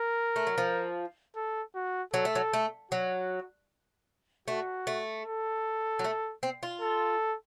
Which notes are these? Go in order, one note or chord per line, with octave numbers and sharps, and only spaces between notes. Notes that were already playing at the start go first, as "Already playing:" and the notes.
Already playing: A#4
A3
F#3
F3
A4
F#4
F#3 A4
A3
F#3
A3
F#3 F#4
A3 F#4
A3
A4
F#3
A3
C4
F4
A4